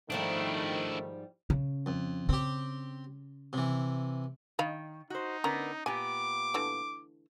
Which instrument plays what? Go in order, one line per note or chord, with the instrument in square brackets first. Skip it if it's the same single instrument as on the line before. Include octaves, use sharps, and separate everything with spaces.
[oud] G#2 F3 G3 [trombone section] D#3 A3 [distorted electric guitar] D4 E4
[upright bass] C#3
[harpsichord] F2
[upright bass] C#3 [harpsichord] C4 G4
[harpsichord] C3 E3
[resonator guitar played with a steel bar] D#3 [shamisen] D#5 F5 B5
[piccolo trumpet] D#4 [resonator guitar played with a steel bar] F#4 C5
[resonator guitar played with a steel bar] D3 B3 A#4 [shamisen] C#4 A#5
[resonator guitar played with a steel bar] A#2 B3 G4 [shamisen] G#5 [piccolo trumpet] D6
[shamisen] D3 E3 A3